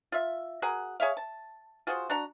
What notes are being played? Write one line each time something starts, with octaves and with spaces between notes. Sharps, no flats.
F4 E5
F#4 G#4 A#4 F#5
G#4 C#5 E5 F5
A5
F4 F#4 G#4 C5
D4 F#4 A#5